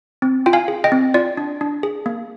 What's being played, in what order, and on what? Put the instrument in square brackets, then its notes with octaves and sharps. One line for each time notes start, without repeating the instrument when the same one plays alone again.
[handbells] C4
F4 G5
F5 G#5
G#4
D#5 G5
C4
F4 D5
D4
D4
G#4
A#3